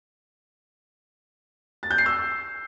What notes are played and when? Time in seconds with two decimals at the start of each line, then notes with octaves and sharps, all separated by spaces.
1.83 A6
1.91 G6
1.98 C7
2.06 E6